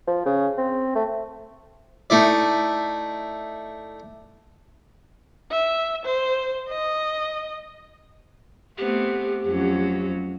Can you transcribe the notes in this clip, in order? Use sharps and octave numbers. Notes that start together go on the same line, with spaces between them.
F3
C#3
C4
A3
A3 D#4 E4 D5
E5
C5
D#5
A3 B3 C4 G4
F2 F#3 C#4